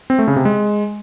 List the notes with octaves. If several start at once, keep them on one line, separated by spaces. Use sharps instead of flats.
C4
A3
C#3
C3
G#3